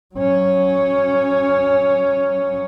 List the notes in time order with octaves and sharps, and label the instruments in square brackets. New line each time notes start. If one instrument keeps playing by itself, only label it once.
[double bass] F#3 C#4